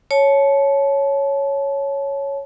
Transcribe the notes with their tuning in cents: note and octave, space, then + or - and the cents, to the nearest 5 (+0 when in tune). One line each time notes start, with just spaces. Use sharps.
C#5 +0 A5 -25